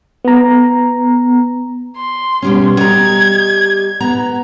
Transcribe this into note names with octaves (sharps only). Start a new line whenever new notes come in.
B3 A#5
C6
B2 G3 C#4
G3 D#5 A#5 G#6
B3 A#5